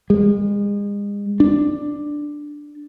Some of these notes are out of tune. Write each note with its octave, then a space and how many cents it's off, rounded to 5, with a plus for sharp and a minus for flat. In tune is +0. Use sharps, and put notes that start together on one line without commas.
G#3 -35
D4 +5